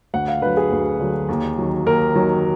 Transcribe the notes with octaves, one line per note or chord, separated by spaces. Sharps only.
D2 F#5
F5
D3 F#3 B4
G#4
D2
D3 F#3
D#2
D#3 F#3
D#2 A#4
D#3 F#3